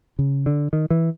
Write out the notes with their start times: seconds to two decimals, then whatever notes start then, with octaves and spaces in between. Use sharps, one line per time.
0.19 C#3
0.46 D3
0.73 D#3
0.90 E3